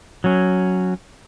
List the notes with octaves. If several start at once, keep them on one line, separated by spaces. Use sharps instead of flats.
F#3 C#4